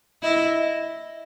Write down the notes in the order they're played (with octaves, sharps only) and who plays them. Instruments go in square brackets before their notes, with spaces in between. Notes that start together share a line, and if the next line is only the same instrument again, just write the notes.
[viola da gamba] E4 [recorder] D#5